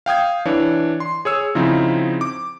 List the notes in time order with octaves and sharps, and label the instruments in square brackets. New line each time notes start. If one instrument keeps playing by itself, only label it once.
[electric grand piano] F5 G5 D#6 G#6
E3 D4 C#5
C6
G#4 C#5 E6
C#3 F3 C4 D#4 E4
D6